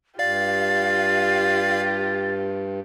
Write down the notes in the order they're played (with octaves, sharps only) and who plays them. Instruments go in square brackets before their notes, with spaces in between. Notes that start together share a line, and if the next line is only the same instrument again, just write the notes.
[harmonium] G2 [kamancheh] F4 G4 [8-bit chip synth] D5 F5 [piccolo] A6